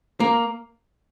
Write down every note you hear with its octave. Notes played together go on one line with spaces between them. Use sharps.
A#3